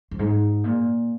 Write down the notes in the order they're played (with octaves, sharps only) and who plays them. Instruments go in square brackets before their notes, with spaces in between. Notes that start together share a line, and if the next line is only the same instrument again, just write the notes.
[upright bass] F2
G#2
A#2